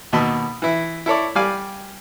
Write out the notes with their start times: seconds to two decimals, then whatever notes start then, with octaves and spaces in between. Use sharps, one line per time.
0.13 D#2 B2 D#5 A5 B5 E6
0.62 E3 E4
1.06 E4 A4 C#5 D5
1.35 G3 G4 D5 F5 G#5